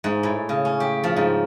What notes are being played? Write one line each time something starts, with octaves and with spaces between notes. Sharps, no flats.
G#2
A2
C#3
C#4
G4
F3
G#2